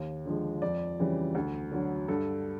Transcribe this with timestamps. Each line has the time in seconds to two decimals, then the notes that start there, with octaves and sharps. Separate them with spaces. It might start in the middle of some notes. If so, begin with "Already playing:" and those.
Already playing: D#2
0.26 D3 F3 G#3
0.62 F2 D5
0.99 C#3 E3 G3
1.35 D2
1.72 D3 F#3
2.08 G2 A4